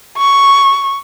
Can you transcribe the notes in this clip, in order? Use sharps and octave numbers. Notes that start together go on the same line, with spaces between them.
C#6